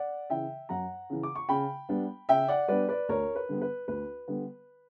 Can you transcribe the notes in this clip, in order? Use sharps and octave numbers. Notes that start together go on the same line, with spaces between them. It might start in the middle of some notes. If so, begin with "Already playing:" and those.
Already playing: D5 F#5
C#3 E3 E5 G5
F#2 F#5 A#5
C#3 E3
D6
C#6
C#3 G5 B5
G3 B3 D4
C#3 E5 G5
D5 F#5
G3 B3 D4 B4 D5
B4 D5
D2 A#4 C#5
B4
D3 G3 B3
B4
D2 B4
D3 G3 B3